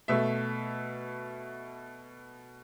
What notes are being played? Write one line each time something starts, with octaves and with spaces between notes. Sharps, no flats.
B2 A3 E5